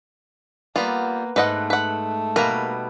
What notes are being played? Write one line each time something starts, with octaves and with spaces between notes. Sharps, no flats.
G3 A#3 B3 F4
G#2 A3 B4 D#5 F#5
B4 F#5
B2 G3 A#3 A#4 B4